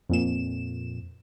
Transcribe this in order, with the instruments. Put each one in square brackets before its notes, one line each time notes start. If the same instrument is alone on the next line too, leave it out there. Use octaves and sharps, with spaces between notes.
[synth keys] F2 A#2 E7